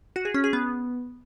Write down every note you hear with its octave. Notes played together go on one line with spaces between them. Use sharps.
F#4
G#4
C#4
G#4
B3